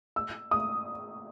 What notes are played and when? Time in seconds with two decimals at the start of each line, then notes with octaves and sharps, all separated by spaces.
0.16 E6
0.51 D#6